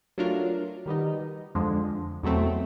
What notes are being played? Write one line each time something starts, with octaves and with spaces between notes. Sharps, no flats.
F#3 A3 D4 F4 A#4
D#3 G3 B3 D#4
F2 D3 F3 G#3
E2 B2 F#3 A3 C4